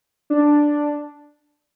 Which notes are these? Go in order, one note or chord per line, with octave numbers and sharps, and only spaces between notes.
D4